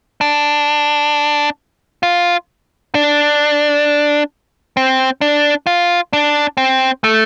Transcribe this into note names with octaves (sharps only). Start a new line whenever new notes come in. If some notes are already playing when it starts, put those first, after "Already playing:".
D4
F4
D4
C4
D4
F4
D4
C4
A3